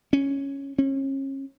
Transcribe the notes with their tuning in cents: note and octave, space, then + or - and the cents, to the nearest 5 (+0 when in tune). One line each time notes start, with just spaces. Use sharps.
C#4 -5
C#4 -35